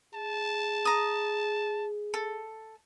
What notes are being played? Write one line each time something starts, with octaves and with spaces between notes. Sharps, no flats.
G#4 A5
A#5 D#6
A4